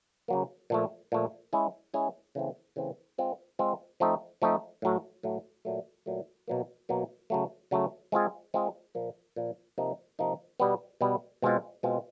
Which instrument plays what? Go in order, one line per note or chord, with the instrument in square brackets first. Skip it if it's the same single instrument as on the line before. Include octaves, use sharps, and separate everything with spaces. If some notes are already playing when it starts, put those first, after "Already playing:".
[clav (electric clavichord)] C#3 F#3 A#3
A#2 F3 A3
A#2 F3 A3
G#3 C#4 E4 G#4
G#3 C#4 E4 G#4
C#3 E3 A3 C4
C#3 E3 A3 C4
G#3 C4 F4
G#3 C4 F4
F3 A3 C4 D#4
F3 A3 C4 D#4
A2 F#3 A3
A2 F#3 A3
A#2 F#3 A3
A#2 F#3 A3
B2 F#3 A#3
B2 F#3 A#3
C#3 F#3 A3
C#3 F#3 A3
G#3 C4 F4 G#4
G#3 C4 F4 G#4
A#2 F3 A#3
A#2 F3 A#3
C3 F3 A#3 D#4
C3 F3 A#3 D#4
B2 G3 B3
B2 G3 B3
B2 G#3 C4 F4
B2 G#3 C4 F4